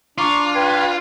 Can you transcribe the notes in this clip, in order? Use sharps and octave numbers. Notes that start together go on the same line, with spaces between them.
D4 F4 A#5 C#6 D6
B4 G5 G#6